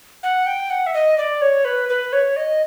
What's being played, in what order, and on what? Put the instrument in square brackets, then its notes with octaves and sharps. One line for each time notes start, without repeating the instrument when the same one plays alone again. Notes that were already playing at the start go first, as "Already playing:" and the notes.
[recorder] F#5
G5
F#5
E5
D#5
D5
C#5
B4
B4
C#5
D#5